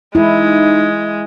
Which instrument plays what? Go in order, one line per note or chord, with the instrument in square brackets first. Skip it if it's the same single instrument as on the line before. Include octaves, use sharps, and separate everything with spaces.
[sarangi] G#3 [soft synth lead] D#4 [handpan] E4